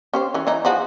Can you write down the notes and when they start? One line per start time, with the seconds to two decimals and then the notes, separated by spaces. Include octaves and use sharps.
0.14 C#4 G4 C5
0.34 E3 C#4
0.47 E3 D#4
0.65 F3 F#4 G#4